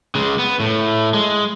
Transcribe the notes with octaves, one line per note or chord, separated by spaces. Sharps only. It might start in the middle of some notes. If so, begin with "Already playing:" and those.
C#3 G#3
B3
A2
G#3